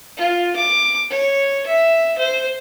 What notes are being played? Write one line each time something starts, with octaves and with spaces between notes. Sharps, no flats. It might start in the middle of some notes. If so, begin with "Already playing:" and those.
F4
D6
C#5
E5
C5